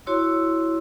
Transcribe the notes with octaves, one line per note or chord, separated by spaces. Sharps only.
E4 F#4 C#5 C6 E6